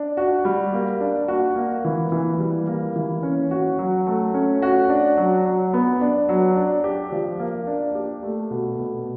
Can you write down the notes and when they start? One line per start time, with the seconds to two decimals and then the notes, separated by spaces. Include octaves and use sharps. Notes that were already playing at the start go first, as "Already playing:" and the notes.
Already playing: D4
0.17 F#4
0.45 G3
0.73 A#3
1.01 D4
1.28 F#4
1.56 A#3
1.85 E3
2.12 E3
2.40 G3
2.67 A#3
2.96 E3
3.23 C#4
3.51 F#4
3.79 F#3
4.07 A3
4.34 C#4
4.62 F#4
4.90 D4
5.17 F#3
5.45 F#3
5.73 B3
6.01 D4
6.29 F#3
6.56 D4
6.84 G4
7.12 F3
7.40 A#3
7.67 D4
7.95 G4
8.23 A3
8.50 B2
8.79 B2